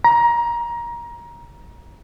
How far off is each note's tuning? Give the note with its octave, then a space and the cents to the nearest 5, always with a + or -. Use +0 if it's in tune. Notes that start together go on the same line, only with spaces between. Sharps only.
A#5 +20